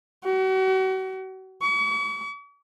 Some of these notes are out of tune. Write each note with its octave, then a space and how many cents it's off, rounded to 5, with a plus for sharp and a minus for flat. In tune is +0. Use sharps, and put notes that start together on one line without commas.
F#4 +40
C#6 +45